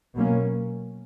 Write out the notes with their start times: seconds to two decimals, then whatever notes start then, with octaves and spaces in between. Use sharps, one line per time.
0.15 B2 F#3 A#3 C#4